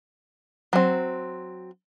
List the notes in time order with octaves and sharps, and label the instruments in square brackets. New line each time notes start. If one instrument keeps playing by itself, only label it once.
[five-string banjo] F#3 C4